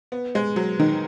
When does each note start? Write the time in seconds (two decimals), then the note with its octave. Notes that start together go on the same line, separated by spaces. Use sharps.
0.12 B3
0.35 G#3
0.56 F#3
0.80 D#3